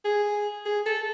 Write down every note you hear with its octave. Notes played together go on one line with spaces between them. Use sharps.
G#4
G#4
A4